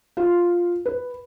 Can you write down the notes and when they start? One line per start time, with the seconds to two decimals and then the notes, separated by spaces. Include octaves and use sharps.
0.17 F4
0.86 B4